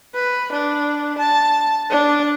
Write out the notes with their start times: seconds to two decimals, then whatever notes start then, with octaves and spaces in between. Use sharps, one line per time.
0.14 B4
0.52 D4
1.18 A5
1.90 D4